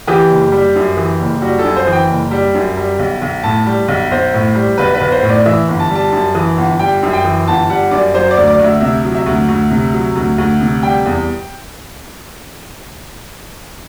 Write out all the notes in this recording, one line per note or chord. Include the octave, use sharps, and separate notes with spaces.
E3 G4
F#1
G3
F#2
E3
F#1
G3 F#4
A4
F#2
C5
E3
G5
F#1
G3
F#2
G3
B1
B1
A2 A5
G3
B1
B1 C5
A2
G3
B1 B4
B4
B1
C5
A2
D5
E3 E5
G1
A5
G3
A5
F#2 A5
E3
G1
G3 G5
F#2
G5
E3
G1 A5
G3 F#5
F#2 D5
F#3 C5
D5
D2
D5
D2
E5
C3 E5
F#3
E5
D2
D2
C3
F#3
D2
D2
C3
G3 G5
E2